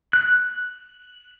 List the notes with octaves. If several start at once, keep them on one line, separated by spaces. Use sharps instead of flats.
F#6